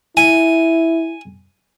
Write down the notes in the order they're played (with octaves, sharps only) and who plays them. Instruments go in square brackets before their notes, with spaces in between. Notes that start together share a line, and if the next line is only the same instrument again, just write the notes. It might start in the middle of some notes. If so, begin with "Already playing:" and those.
[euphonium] E4 [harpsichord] G#5